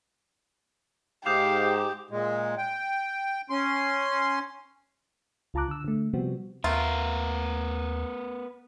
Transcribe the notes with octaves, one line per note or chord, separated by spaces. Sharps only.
G#2 G4 F5 D6 D#6 G6
A#2 G#3
G5
C#4 C6
C#2 F4 A5 A#5 D6 F#6
D3 E6
D3 A3
C3 F3 G3 B3 C4 F#4
D#2 A3 B3 F4 A#4